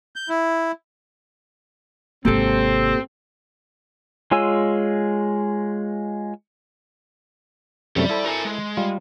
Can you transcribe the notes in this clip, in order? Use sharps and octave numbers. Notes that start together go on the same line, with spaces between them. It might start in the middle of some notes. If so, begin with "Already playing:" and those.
G6
E4
G#1 C3 A#3 C4 G4 A4
G#3 F4 C#5 G#5 E6
F#2 C3 A3 G4 D5
E4 A4 C5
A#4 G#5
G#3
G3 F4